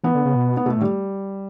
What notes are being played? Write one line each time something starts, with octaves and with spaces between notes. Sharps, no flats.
E3 B3
D3
C#3
B2
B3
B2 A3
A2
G3